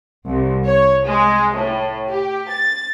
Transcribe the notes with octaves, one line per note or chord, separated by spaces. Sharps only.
C2
C#5
G#3
A2
G4
A6